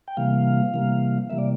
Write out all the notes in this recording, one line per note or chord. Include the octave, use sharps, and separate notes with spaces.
G5
C3 E3 G3 A#3 F5
C3 E3 G3 A#3
C3 E3 G3 A#3 E5
D5